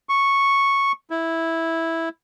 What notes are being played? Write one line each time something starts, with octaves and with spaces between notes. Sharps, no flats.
C#6
E4